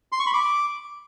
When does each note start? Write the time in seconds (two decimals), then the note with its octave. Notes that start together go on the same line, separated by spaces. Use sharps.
0.12 C6
0.19 C#6
0.27 B5
0.34 D6